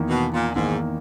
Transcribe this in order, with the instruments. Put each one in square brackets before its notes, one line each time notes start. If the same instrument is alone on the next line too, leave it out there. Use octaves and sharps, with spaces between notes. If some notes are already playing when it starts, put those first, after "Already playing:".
Already playing: [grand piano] E2 D#3 A#3
[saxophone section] B2
A#2
[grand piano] E2 D#3 A#3 [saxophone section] G#2